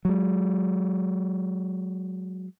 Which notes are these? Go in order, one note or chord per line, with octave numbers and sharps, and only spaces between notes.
F#3 G#3